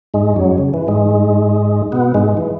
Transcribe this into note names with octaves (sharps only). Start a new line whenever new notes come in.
G#2 G#3
F#2 F#3
C#3
E3
G#2 G#3
B2 B3
G#2 G#3
E3